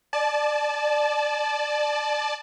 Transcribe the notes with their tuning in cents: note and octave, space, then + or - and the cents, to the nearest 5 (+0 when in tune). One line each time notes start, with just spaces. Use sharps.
D5 +20 A5 -25